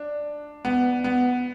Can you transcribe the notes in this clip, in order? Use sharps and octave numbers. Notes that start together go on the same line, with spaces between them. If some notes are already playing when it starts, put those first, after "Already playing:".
Already playing: D4
B3
B3